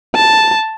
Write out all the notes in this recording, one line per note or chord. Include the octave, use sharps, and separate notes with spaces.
A5